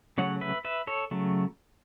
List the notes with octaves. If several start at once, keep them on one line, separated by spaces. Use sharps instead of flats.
C#3 F#3 A3 C#5 F#5
B4 E5
B4 E5
A4 C#5
C#3 F#3 A3